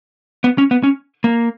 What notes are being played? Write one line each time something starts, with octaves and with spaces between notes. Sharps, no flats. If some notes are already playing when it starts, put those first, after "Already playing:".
B3
C#4
B3
C#4
A#3